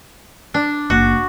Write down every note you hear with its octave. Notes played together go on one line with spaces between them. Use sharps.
D4
F#1 F#4